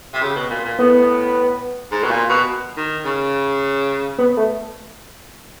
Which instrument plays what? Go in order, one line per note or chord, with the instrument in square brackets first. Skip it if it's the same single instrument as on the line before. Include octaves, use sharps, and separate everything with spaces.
[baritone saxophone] C3
C#3
B2
A#2
A#2
[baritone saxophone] A2 [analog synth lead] B3
[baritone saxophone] G#2
B2
A#2
B2
D#3
C#3
[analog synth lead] B3
A3